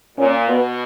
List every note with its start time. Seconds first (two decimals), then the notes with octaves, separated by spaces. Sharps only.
0.18 A#2 C#4
0.48 B2 B3